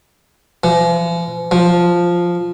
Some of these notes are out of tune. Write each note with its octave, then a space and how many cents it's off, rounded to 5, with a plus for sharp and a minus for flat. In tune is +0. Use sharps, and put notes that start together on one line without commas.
F3 -45
F3 +0